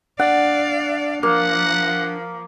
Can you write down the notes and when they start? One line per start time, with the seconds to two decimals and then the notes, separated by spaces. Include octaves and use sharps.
0.19 D4 D5 F5 F#5
1.23 F3 A#3 F#5